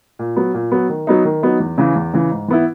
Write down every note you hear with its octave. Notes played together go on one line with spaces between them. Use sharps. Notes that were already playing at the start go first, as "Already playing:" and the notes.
A#2
F#3 B3
A#2
F#3 B3
D#3
F#3 B3 D#4
D#3
F#3 B3 D#4
E2
C#3 E3
E2
C#3 E3
G#2
E3 B3 E4